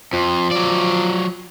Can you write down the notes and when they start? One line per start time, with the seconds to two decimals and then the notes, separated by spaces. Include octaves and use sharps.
0.13 F2 F3
0.51 F#3 D5